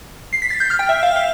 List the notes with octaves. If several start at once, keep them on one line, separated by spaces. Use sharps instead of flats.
C7
B6
A6
G6
F6
G5
E5
F5
F5